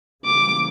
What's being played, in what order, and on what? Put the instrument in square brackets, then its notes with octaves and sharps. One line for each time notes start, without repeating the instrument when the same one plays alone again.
[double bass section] C#3 E3 G3 A#3 [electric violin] D6